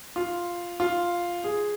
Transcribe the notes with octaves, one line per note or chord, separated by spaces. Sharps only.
F4
F4
G#4